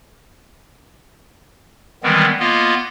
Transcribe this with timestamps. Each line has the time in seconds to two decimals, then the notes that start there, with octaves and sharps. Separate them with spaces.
2.03 D#3 E3 G3 G#3 B3 C4
2.40 A#3 B3 F4 D#5